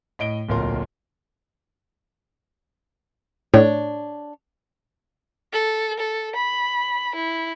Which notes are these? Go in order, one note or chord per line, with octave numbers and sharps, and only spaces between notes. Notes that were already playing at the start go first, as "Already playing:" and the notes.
A2 D#5 D7 G7
D1 B1 A#2 F4 A#4 C6
A2 D4 C#5
A4
A4
B5
E4